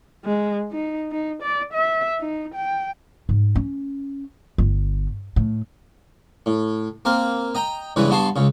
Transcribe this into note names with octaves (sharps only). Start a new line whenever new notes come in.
G#3
D#4
D#4
D5
E5
D#4
G5
G#2
C#4
G1
A2
A2
A#3 C4 A#4
D#5 G5 A#5
G2 C#3 E3 G#3 B4
G2 B3 F#4 A5 C6 C#6
C#2 C#3